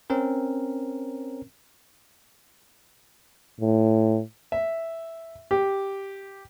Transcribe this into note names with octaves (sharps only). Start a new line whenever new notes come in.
C4 C#4 A#4
A2
E5
G4